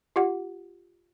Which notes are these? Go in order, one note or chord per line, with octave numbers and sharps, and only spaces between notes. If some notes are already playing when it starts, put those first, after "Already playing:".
F4 G4 F#5